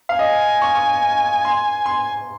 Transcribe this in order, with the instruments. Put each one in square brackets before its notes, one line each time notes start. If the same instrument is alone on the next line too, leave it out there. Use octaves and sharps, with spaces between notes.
[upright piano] F5
[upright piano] D#5 [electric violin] G#5
[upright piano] C#6
C#6
C6
C6